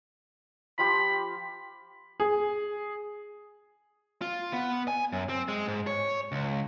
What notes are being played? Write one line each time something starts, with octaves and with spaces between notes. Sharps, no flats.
F3 F4 G4 B5
G#4
F4
B3
G#5
F#2
C4
G#3
G#2
C#5
C#2